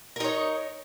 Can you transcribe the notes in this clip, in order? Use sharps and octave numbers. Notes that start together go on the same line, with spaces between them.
D#4 A#4 C#5